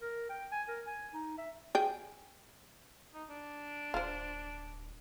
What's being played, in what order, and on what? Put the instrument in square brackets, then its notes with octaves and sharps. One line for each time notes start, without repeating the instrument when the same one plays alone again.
[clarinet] A#4
G5
G#5
A#4
G#5
D#4
E5
[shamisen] G#4 G5
[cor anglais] D#4
D4
[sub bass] D1 [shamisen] F4 C5